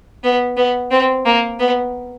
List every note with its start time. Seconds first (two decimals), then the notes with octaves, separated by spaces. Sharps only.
0.24 B3
0.57 B3
0.91 C4
1.26 A#3
1.59 B3